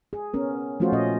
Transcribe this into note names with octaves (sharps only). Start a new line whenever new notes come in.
G#4
B3 C#4 A#4
F3 A3 C#4 F4 F#4 C5
A#2 C#4 D#5